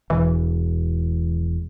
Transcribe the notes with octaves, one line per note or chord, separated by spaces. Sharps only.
E1 E3